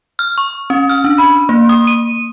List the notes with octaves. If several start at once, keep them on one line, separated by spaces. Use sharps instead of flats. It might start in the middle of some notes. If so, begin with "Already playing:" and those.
F6
C#6
C#4
F6
D4
B5
A#3
D#6
D#7